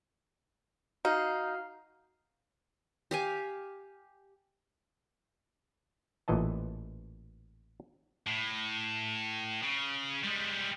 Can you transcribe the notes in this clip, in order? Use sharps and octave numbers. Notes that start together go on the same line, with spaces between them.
D#4 F#4 F5 F6
G4 F5 G#5
A1 A#2 E3 D#5 A5
A2
C#3
G3 G#3